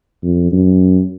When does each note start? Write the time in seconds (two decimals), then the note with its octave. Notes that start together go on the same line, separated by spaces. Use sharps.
0.23 F2
0.52 F#2